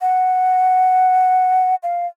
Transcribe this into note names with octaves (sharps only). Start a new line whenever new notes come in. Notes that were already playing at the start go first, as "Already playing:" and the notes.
F#5
F5